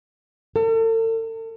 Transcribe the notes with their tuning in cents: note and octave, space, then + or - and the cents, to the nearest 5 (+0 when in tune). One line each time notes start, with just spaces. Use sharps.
A4 +40